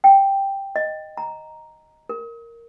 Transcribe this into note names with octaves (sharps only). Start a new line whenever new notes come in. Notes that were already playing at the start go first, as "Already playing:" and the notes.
G5
D#5
A#5
A#4